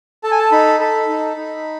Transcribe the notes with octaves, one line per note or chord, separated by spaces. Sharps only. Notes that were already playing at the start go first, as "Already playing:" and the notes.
A4 A5
G#5
A5
D#4 B5
A4 B5
D#4
D#4